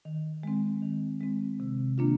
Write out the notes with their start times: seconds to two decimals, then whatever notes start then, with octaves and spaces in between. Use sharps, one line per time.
0.05 D#3
0.43 G#3 C4
0.82 D#3
1.20 G#3 C4
1.60 C3
1.98 D#3 A#3 D4 F4